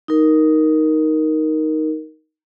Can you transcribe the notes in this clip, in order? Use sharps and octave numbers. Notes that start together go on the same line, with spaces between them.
D#4 A#4